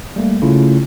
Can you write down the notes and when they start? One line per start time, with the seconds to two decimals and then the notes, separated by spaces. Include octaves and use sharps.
0.16 G3 A3 A#3
0.42 C#3 A3 C#4 E4 F4